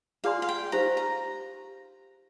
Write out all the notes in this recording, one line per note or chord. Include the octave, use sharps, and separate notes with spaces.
F4 G#4 D5 F5 G#5 C6
F5
G5
D#4 G4 C5 F5 A#5
A#5